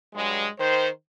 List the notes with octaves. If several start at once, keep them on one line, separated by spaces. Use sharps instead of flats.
G2 F#3 G#3
D#3 C5